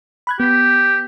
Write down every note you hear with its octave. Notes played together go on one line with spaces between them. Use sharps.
B5 F#6 G#6
B3 G4 B6